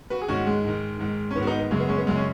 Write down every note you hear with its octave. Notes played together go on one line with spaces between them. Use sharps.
F#4 B4
G#4
G#2 D#3 C#4 F#4
G#3
G#2 D#3
G#2 D#3
C#4
G#2 D#3 B3
F#4
B3 D#4
B3
F#2 C#3 G#3
B3
G#3 C#4
B3
F#2 C#3 G#3
C#4